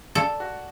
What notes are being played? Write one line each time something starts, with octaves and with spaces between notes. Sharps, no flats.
A4 D5
F#4